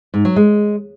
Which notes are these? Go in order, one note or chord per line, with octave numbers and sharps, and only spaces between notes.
G#2
F#3
G#3